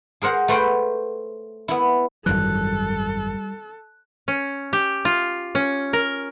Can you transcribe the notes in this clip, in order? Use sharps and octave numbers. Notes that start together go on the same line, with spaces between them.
G#4 A#4 C5 F#5
A3 B4 C5 F#5 G5
B3 E4
G#1 F#2 E3 G3 A4 F#6
C#4
G4
F4
C#4
A#4